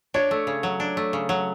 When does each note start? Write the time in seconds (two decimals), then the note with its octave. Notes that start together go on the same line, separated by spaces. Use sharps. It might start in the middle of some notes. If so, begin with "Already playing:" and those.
0.14 D4 C#5
0.31 A3
0.47 C#3
0.63 F#3
0.80 D4
0.97 A3
1.13 C#3
1.29 F#3